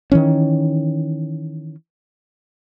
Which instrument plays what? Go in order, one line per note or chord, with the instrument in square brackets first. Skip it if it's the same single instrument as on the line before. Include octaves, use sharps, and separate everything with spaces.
[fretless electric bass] D#3 E3 C#4